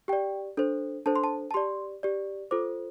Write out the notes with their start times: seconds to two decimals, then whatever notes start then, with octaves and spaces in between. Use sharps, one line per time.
0.08 G4 D5 G5
0.57 D4 A4 C5
1.06 D4 A4 C5 A5
1.16 C6
1.24 A5
1.51 A5
1.54 G4 D5 C6
2.03 G4 D5
2.51 F4 A4 C5 D6